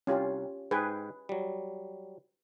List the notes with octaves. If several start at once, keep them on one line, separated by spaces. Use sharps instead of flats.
C2 C#4 F4 G4
G#2 G#4 B4 G5 G#5
F#3 G3